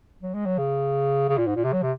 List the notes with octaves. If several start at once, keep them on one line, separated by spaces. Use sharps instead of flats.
F#3
G#3
F#3
C#3
C#3
A#2
G#2
A#2
C3
F#3
C3